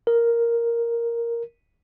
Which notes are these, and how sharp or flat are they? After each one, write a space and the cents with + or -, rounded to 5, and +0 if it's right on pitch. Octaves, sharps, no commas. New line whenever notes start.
A#4 +0